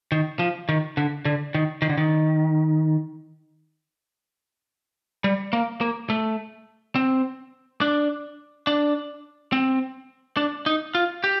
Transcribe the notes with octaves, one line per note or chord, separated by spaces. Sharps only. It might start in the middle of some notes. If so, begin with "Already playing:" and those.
D#3
F3
D#3
D3
D3
D#3
D#3
D3
D#3
G3
A#3
A#3
A3
C4
D4
D4
C4
D4
D#4
F4
G4